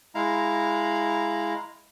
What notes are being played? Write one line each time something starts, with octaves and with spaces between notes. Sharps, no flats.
G#3 E4 F5 A#5